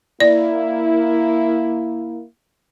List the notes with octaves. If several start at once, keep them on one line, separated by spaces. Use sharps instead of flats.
A#3 E4 D5